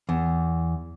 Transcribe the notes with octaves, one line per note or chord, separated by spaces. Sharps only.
E2